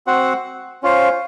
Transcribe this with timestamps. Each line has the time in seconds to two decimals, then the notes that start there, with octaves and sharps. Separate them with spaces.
0.07 C4 F#4 C5 F#5
0.83 C#4 F4 C5